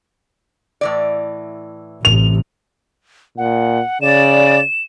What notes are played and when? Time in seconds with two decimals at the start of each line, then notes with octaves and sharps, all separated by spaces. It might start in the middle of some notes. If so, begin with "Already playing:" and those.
0.81 A2 E3 D5
2.05 A1 C3 F7
3.38 A#2 F#5
4.02 C#3 D5 E7